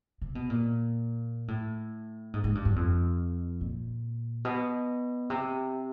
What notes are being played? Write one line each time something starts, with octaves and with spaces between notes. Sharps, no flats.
C3
B2
A#2
A2
G#2
G#2
G2
F#2
F2
A#2
B2
C3